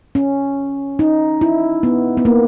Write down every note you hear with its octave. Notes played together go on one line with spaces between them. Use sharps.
C#4
D#4
E4
B3
B3
A#3